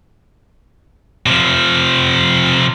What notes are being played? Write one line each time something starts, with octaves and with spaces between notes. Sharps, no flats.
C3 F3